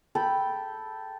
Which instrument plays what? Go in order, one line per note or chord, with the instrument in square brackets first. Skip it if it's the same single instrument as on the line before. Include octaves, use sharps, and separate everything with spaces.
[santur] A4 G5 B5